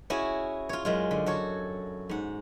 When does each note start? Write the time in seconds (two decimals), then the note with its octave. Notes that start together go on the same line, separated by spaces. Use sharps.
0.10 C#4 E4 F#4 G#4
0.69 F4 C#5
0.85 F#2 G#3 F4
1.11 D3
1.26 F#4 A4 C#5
2.09 G#2 F#5